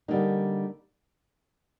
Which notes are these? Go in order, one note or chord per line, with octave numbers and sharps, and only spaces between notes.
D3 G3 A#3 D#4